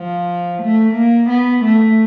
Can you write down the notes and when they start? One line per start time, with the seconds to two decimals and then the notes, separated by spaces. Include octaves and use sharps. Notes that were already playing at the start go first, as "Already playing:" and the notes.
Already playing: F3
0.61 A3
0.94 A#3
1.29 B3
1.63 A3